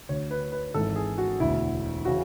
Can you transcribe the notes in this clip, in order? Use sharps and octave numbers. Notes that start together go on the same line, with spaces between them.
D2 D3 C#5
B4
B4
G#1 G#2 E3 A4
G#4
F#4
E1 D2 D3 E4
C#3 E3 F#4